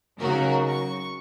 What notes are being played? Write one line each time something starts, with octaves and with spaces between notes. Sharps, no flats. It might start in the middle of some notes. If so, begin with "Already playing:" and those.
C#3 F#3 D#4 F#4 A#4
C#6